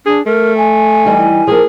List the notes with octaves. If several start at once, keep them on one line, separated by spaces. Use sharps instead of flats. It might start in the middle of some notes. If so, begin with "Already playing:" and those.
D4 G#4
A3 A#4
G#5
E3 G3 D#4
F3 A#3 G#4